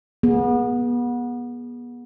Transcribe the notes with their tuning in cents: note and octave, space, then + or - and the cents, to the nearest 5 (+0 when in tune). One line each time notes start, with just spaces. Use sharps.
B3 -30 G#4 +0